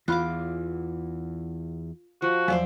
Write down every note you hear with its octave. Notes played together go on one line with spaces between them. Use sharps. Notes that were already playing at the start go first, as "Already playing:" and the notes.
E2 E3 F4 F5 B5 D6 F#6
F3 F#4
E2 F3 F#3 C5 D5 E5